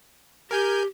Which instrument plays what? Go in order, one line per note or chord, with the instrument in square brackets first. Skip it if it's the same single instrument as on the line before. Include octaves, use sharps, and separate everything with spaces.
[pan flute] G4 [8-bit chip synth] A#4 G#5 G6